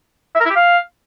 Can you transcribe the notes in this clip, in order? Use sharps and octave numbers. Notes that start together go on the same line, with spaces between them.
E5
A#4
E4
G4
F5